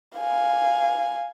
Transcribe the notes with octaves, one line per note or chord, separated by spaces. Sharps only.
F5 G#5